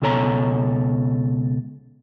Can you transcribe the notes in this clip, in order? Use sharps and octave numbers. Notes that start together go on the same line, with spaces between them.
C#2 B2 A4 C#5 A#5